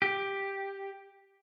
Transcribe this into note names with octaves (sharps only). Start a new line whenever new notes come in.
G4